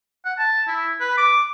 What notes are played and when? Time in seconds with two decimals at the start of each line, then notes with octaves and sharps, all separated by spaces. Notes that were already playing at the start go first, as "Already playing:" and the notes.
0.25 F#5
0.38 A5
0.68 E4
1.01 B4
1.18 D6